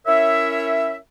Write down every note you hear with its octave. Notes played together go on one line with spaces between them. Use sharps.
C#4 E4 A#4 C#5 E5